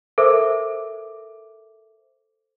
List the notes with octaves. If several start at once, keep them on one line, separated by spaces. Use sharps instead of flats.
A4 A#4 C5 E5 D6